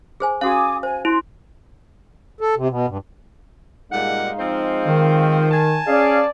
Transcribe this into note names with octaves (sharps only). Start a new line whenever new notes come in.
G#4 C5 G#5
C#4 F#4 G#4 F5 G#5 D6 D#6
C5 G#5
E4 C6
A4
C3
B2
G2
A#2 G3 G#3 D#4 F5 F#5
F3 C4 C5
D#3
G#5 A5
C#4 G#4 D5 F5